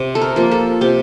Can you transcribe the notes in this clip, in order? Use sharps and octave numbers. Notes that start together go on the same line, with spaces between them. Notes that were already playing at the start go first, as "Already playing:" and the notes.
Already playing: C3
A4
A#4
F3 A#3
A4
C3 G4